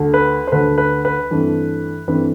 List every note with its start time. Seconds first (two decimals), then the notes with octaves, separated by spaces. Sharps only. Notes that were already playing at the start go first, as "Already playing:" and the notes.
Already playing: D2 D3 A3
0.14 B4
0.47 C5
0.52 D2 D3 A3 B4
0.78 B4
1.05 B4
1.30 G2 E3 A3 C4
2.08 G2 E3 A3 C4 B4